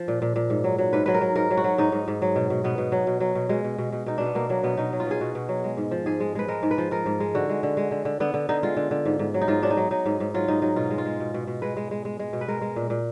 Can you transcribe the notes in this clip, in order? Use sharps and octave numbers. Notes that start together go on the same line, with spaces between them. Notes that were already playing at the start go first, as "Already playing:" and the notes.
Already playing: F3
A#2
A#2
A#2
G#2
F#3
F#3
G#2 B4
F#3 B4
A#4
F#3
G#2 A#4
F#3
F#4
F#3
G#2 D#4
G#2
G#2
F#3
B2
B2
B2 B3
B2
F#3
B2
F#3
B2
B2 G#3
B2
B2
B2
B2 D#4
B2 D4
B3
B2 A#3
F#3 A#3
B2 B3
B2 D#4
F#3
F4
B2 G#4
B2 F#4
B2
F#3
G#3
G#2
F3
G#2 G#4
G#3
G#3 B4
G#3 A#4
G#2
B4
F3
F3 A#4
G#2
G#3
D3 F#4
G#3
D3
G#3
D3
D3
D3 B3
D3
D3 D#4
G#3 F4
D3
D3
G#2
G#2
F#3
D#4
G#2 F4
F#3 D4
D#4
F#3
F#3 D#4
G#2
G#2
F#3 F4
G#2 D#4
F#3 D#4
B2 F4
G#3
F4
G#3
B2
B2
B2
G#3 B4
G#3
G#3
G#3
G#3
B2
B4
G#3 A#4
G#3
A#2
A#2